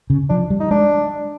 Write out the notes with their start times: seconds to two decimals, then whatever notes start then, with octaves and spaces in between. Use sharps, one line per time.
0.10 C#3
0.29 F3 D4
0.50 G3
0.60 D#4
0.71 G#3 D4